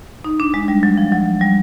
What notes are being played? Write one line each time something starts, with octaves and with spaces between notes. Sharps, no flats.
D#4
D4
G#3
G3
F#3
F3
F#3
G3